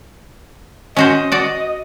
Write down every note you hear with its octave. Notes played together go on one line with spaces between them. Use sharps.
C#4 F#4 C5 D#5
F#4 D5